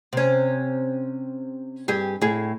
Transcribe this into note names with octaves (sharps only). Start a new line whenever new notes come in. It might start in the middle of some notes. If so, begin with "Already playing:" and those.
C3 C#4
G2 G4 G#4
A2 G#4